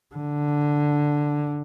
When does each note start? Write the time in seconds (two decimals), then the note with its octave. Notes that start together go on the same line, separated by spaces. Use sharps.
0.15 D3